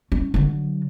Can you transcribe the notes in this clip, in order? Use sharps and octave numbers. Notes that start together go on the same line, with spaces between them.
C#4
D3 F#3